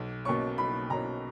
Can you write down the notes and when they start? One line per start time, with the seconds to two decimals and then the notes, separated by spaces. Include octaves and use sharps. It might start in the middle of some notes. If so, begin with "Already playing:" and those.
Already playing: B1
0.25 B2 A#3 C#4 C#6
0.58 B1 B5
0.90 B2 A#3 C#4 A#5